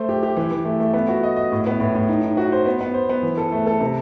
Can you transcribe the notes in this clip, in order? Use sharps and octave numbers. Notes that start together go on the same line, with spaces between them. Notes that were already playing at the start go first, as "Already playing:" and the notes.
Already playing: A3 C5
G4
G4
E3
E3
A3
A3
B3
F#4
D#5
D#5
A2
B3
A2
A2
D#4
D#4
F#4
C5
B3
B3
C5
B3
E3
A4
A3
A4
C3